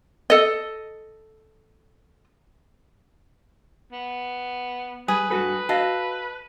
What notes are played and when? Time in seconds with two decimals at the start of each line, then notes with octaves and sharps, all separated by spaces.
0.30 A4 D#5
3.92 B3
5.08 G3 G#4 B4
5.30 G2 F#4 A4 B4
5.69 F#4 A4 D#5 F5